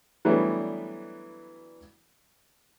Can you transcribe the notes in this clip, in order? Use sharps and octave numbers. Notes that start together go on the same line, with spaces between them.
E3 F#3 G3 A3 B3 D4